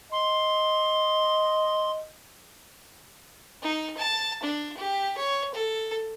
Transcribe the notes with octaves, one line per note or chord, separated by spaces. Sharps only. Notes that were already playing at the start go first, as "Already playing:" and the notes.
D#5 C6
D#4
A5
D4
G4
C#5
A4